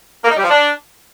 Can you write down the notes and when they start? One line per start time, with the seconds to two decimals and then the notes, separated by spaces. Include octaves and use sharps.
0.23 A#3
0.30 D#4
0.36 G3
0.43 F3
0.49 D4